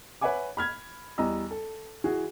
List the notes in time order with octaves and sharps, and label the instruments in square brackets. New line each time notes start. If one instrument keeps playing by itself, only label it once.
[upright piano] B4 C#5 E5 F#5 G#5 D6
B5 F6 G#6
E2 G3 D#5 A#5 E6
A4
E3 F#4 G#4